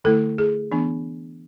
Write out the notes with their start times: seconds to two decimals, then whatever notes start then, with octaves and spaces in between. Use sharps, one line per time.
0.04 D3 A3 E4 A4
0.38 G#4
0.71 E3 B3 D4